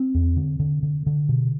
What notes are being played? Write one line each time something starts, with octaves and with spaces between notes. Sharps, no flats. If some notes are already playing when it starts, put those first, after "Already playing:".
Already playing: C4
E2
D3
D3
D3
D3
B2